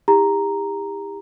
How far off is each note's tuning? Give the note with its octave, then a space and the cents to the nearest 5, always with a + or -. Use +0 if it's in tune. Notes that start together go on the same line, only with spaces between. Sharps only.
E4 -25 G4 +35 A#5 +0